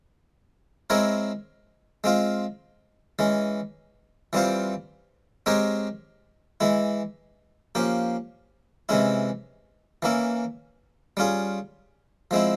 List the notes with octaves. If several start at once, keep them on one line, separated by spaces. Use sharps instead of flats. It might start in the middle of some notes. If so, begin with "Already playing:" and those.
G#3 C4 E4 A#4 C#5
G#3 C4 F4
E3 G#3 C#4
E3 G3 C4 F4 C5
G#3 C4 G4 A#4 C#5
E3 G#3 E4
F3 A#3 C#4 G4
C3 E3 G#3 C#4 E4
E3 A#3 C#4 E4
G3 C#4 F4 G#4
F3 G#3 C4 E4